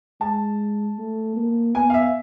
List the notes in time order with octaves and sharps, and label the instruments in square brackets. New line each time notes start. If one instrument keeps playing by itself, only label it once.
[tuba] G#3 [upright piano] A5
[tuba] A3
A#3
[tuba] B3 [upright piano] G#5
[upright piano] F5
E5